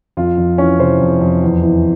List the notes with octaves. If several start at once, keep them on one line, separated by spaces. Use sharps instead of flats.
F2 F4
F2
E3 C#4
C3 C5
F2
F2
E2
E3